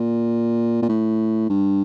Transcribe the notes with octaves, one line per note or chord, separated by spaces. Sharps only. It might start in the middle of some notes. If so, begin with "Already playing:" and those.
Already playing: A#2
A#2
A2
G2